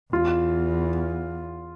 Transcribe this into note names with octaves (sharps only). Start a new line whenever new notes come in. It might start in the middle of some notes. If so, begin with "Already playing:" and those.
E2 F4